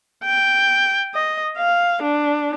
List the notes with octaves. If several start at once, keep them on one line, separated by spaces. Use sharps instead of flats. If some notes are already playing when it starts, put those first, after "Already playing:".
G5
D#5
F5
D4